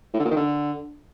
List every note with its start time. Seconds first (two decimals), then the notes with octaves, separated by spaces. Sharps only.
0.13 A2
0.19 D3
0.25 A#2
0.31 D#3
0.36 D3